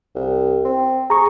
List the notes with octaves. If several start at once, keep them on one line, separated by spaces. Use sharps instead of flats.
C2
C4
G#4 A#5 C#6